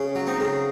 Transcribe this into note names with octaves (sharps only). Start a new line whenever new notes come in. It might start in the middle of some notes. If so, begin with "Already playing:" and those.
Already playing: C#3 C#4
F#3
C4 D#4
C#3